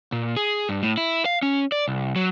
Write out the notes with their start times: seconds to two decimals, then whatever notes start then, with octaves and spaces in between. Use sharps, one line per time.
0.12 A#2
0.36 G#4
0.69 G2
0.83 A2
0.97 E4
1.26 F5
1.43 C#4
1.72 D5
1.88 C2
2.16 F#3